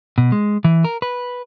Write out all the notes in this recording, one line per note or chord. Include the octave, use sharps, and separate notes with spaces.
B2
G#3
E3
A#4
B4